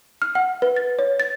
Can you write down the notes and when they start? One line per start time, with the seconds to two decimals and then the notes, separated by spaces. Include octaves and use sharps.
0.22 F6
0.35 F#5
0.62 B4
0.76 A6
0.99 C#5
1.20 A6